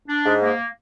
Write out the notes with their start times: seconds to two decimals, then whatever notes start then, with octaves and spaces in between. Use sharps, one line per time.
0.08 D4
0.25 G#2
0.42 A#3